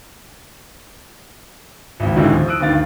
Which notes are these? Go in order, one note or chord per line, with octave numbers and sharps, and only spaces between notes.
G#1 C#2
A1 D#2 B2 D3 E3 G#3
F3
D#6 E6 F#6 D7
D2 G2 D#3 F5 A6